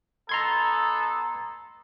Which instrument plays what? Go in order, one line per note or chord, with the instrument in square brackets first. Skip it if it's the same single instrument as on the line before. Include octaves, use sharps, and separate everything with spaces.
[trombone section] B3 D#4 A4 [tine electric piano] A#5 C6 G#6